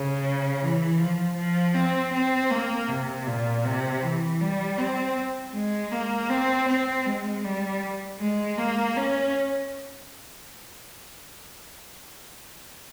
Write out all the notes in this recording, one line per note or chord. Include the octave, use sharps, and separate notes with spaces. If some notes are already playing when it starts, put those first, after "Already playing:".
Already playing: C#3
E3
F3
F3
C4
C4
A#3
C3
A#2
C3
E3
G3
C4
G#3
A#3
C4
C4
G#3
G3
G#3
A#3
C#4